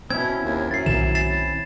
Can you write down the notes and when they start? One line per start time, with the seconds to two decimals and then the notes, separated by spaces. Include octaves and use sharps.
0.10 B2 C4 C#4 E4 G#6
0.43 D#2
0.71 F#2 A6 C7
0.86 B1 A#2 D#3 E7
1.15 A6 C7 E7